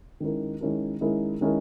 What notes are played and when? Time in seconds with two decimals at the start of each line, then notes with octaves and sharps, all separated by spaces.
0.20 D#3 G#3 C#4 E4 A#4
0.61 D#3 G#3 C#4 E4 A#4
1.01 D#3 G#3 C#4 E4 A#4
1.41 D#3 G#3 C#4 E4 A#4